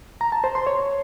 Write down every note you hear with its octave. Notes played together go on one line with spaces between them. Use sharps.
A#5
A5
C5
C6
C#5